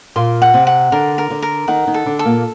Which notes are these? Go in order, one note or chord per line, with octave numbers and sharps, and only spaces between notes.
A#2 A#3 C6
F#5
C3 C4
F#5
D3 D4 A#4
A#4
D3 D4
A#4
D#3 D#4 F#5
D#3 D#4
A4
D3 D4
A4
A#2 A#3